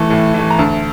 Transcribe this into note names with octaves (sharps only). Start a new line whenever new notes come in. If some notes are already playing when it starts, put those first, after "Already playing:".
Already playing: E3 A3 A5
A2
E3 A3
A#5
D2 A5